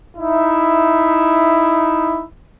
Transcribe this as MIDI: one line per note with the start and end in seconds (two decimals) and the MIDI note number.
0.17 2.23 63
0.17 2.23 64
0.17 2.23 76